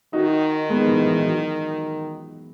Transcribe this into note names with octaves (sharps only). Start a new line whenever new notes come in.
D#3 D#4 F#4
G#3 B3
E3
E3
F#3